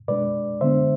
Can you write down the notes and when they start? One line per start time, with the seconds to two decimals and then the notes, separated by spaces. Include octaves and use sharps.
0.08 B2 G#3 D4 B4 D5
0.61 D3 G#3 B3 D4 C5 E5